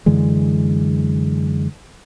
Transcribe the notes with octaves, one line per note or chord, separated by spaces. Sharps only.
F#2 D3 E3 G#3